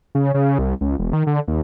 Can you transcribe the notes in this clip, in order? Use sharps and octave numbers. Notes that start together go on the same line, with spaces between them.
C#3
C#3
C2
C#2
E1
D#3
D3
D#2